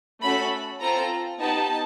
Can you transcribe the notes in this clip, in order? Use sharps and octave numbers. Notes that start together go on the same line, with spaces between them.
A3 C#4 F#4 A4 B5
C4 F4 A4 A#5
B3 D#4 G4 A5